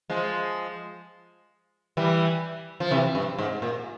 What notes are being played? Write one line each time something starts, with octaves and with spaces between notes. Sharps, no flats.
F3 G#3
E3 G3
F3
C3 E3
G2
G#2
A#2